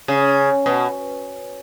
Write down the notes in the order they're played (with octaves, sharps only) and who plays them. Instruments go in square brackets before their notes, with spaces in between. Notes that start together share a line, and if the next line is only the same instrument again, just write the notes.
[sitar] C#3
B2